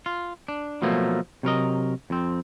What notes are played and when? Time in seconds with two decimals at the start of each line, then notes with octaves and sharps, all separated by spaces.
0.06 F4
0.48 D4
0.82 B2 F3 F#3 A3 A#3
1.43 C3 F#3 A#4 D#5
2.10 F2 C4